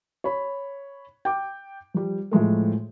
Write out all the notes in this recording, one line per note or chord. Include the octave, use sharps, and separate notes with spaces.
C#5 B5
G5 D6
F3 G3
A2 F3 G#3 A3